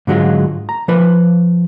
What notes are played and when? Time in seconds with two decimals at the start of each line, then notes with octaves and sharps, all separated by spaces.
0.07 G#2 D3 F#3 G#3 F4
0.69 A#5
0.88 F3 B4